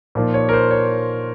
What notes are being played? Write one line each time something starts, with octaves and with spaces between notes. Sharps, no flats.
A#2 F3 A#3 D#4
C#5
A#4
C5
C#5